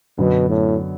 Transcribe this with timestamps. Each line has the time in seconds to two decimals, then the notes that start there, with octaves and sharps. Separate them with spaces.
0.18 F#2 B2 D3 F#3 B3
0.49 A2